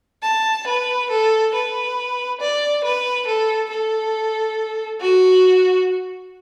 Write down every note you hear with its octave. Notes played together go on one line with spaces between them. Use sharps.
A5
B4
A4
B4
D5
B4
A4
A4
F#4